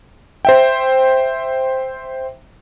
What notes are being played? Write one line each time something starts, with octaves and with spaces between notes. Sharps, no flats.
C5 E5 G5